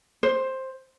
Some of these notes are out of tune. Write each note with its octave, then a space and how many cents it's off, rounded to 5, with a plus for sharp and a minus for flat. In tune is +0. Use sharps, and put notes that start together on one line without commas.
C5 +10